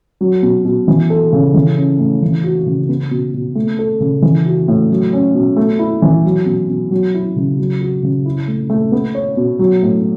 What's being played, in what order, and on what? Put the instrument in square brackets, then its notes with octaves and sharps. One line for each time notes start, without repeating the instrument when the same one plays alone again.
[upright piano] F#3
B2
B2
E3
A4
C#3
E3
C#4
A2
E3
F#4
C#3
B3
B2
B2
A3
A4
C#3
E3
F#4
A2
F#3
C#4
B2
A3
E4
E3
F#3
B2
B2
F#3
E4
C#3
F#3
F#4
C#3
E4
A3
A3
B3
C#5
B2
F#3
A2